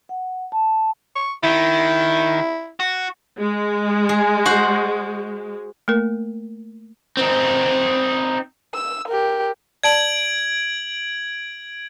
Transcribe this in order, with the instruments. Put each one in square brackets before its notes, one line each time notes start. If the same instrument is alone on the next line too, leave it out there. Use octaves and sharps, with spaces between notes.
[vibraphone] F#5
A5
[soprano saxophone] C#6
[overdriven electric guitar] D#3 [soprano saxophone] E4
[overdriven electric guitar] F#4
[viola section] G#3
[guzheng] G#4
F#4 C5 F#5
[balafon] A3 A#3 A#4
[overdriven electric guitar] C4 D#4
[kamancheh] E6
G4 A#4
[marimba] D5 A5 [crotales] G#6 D7 F#7